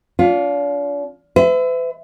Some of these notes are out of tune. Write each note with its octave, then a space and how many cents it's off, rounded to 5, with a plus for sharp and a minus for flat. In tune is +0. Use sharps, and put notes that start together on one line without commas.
D4 -40 F4 +10
B4 +45 E5 +0